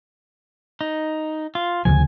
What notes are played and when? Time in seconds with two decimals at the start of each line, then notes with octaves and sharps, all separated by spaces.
0.81 D#4
1.55 F4
1.85 D2 C#3 F3 G#5